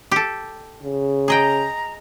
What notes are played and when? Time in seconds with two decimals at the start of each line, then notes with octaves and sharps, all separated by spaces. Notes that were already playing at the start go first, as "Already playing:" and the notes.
0.11 G4 A4
0.83 C#3
1.28 G#4 D#5 G5 A#5